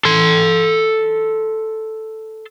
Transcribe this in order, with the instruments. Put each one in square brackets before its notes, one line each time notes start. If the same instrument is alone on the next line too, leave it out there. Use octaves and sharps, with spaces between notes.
[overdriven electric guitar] A4 C6